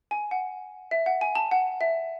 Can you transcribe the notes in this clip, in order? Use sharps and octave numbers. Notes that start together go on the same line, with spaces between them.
G#5
F#5
E5
F#5
G#5
A5
F#5
E5